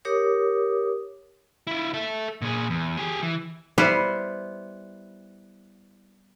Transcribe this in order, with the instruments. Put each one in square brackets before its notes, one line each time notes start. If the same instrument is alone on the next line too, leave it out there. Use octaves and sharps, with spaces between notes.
[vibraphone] G4 A#4 C#5 D6 D#6
[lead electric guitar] E4 F4
A4 E5
A#2 G#4
E2
G4 G#4
E3
[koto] G3 B3 E4 C5 F5